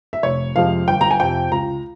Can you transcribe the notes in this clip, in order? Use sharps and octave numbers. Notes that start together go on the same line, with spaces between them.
E5
F1 C#5
F2 C3 F3 G#3 F5
G1 G5
A#5
G#5
F2 C3 G5
C#2 A#5